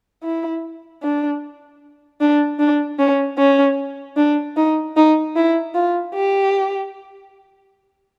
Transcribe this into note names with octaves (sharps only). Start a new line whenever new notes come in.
E4
D4
D4
D4
C#4
C#4
D4
D#4
D#4
E4
F4
G4